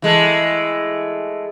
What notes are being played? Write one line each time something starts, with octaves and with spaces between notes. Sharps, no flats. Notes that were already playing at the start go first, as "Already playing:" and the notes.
E3 G#3 A3